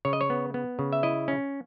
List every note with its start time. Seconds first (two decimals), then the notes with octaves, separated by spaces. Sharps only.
0.05 C#3 C#5
0.13 D#5
0.21 C#5
0.30 B3
0.54 B3
0.79 C#3
0.93 E5
1.03 E4 D#5
1.28 C#4